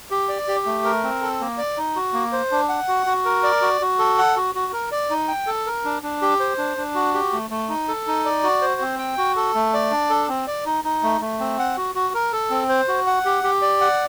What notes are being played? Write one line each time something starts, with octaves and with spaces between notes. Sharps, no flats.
G4
D5
G4
A3
A#4
C4
A4
A#3
D5
D#4
F#4
A#3
C5
D4
F#5
F#4
F#4
A#4
D5
F#4
F#4
A4
F#5
F#4
F#4
A#4
D5
D#4
G5
A4
A#4
D4
D4
G4
C5
D4
D4
F#4
G4
A3
A3
D#4
A4
D#4
D5
F#4
C5
C4
G5
F#4
A4
A3
D5
D4
A4
C4
D5
D#4
D#4
A3
A3
C4
F#5
F#4
F#4
A#4
A4
C4
C5
F#4
F#5
G4
G4
D5
F#5